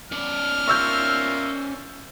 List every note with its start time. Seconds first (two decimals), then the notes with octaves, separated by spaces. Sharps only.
0.12 C#4 D5 F6
0.68 A#3 F4 E5 C#6 E6 G6